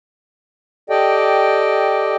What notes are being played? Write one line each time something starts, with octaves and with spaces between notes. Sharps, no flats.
G4 A4 D5 D#5 G5